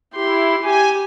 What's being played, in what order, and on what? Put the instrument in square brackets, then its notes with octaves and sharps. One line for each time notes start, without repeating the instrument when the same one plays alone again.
[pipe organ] E4 [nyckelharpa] G4 C6
[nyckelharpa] G4 [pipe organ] G#5